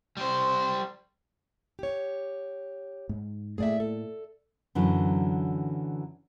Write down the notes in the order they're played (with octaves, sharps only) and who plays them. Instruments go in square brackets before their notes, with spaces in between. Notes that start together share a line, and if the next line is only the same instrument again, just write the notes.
[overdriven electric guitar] G3 C5
[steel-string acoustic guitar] G4 C#5
[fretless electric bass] G#2
[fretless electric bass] A2 A3 A#3 [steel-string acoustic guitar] G#4 D5 E5
[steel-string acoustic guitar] A4
[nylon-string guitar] F#2 D3 E3 F#3